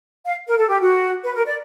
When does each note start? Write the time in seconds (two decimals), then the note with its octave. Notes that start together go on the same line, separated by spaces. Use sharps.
0.25 F5
0.47 A#4
0.58 A4
0.69 G4
0.80 F#4
1.24 B4
1.34 A#4
1.46 D5